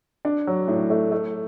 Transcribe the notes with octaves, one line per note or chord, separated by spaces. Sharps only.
D4
F#3
A2
A3
A3